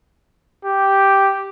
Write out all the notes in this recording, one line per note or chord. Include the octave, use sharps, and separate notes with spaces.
G4